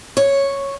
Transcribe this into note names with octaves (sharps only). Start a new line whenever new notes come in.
C#5